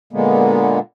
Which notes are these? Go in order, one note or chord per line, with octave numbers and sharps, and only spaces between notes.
A#2 D3 G#3 A#3 B3